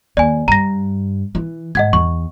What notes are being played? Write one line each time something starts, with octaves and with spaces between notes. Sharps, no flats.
D#2 D5 G#5
G2 A#5 A#6
E3
G#2 D#5 F#5 G#6
E2 C#6